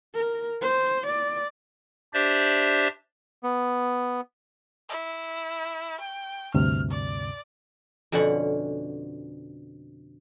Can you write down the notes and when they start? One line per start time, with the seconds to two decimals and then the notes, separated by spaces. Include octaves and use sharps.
0.14 A#4
0.62 C5
1.07 D5
2.14 D4 G4 C5 D5 E5
3.43 B3
4.89 E4
6.01 G5
6.54 D2 G2 C3 F6
6.90 D5
8.12 F2 B2 D3 C#4 F#5